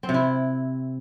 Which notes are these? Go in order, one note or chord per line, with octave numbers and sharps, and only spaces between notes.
C4
C3
E4